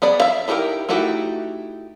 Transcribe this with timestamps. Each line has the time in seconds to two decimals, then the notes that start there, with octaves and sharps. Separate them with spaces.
0.02 B3 G#4 D5 B5
0.20 E5 F5
0.48 D#4 E4 F#4 G4 A#4
0.89 A3 D#4 E4 F#4 G4